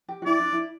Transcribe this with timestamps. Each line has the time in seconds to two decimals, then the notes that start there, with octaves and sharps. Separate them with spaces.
0.08 G4
0.22 F#4
0.25 E4 D5
0.40 D4
0.53 E4